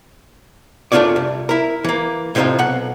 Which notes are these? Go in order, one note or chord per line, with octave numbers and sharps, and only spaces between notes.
F#2 A3 D4 F4 C#5 D5
C2
E4 A#4
E3 A#3
A2 C3 C4 C#4 D#4 F4
B1 F#5